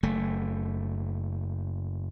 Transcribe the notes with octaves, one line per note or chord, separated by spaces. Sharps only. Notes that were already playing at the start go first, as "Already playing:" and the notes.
F#1 A3